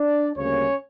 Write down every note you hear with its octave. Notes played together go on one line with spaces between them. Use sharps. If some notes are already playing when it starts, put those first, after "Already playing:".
Already playing: D4 D5
D2 C#3 G3 A#3 C#4 C#5